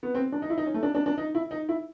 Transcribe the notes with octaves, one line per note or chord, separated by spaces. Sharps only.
B3
C4
D4
D#4
E4
D#4
C#4
A3
D4
D4
D4
D#4
E4
D#4
E4